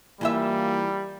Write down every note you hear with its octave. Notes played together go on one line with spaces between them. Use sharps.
E3 G3 A#3 F4 E5